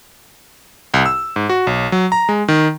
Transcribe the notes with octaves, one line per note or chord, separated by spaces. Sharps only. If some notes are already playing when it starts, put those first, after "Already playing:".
C2
E6
G#2
F#4
B1
F#3
A#5
G#3
D#3